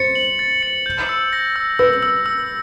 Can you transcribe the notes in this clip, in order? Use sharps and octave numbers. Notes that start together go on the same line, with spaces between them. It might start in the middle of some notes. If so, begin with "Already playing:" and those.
Already playing: C5 A6 C#7
F#7
A6
C#7
G6
E6
A#6
E6
B4 E6
E6
E6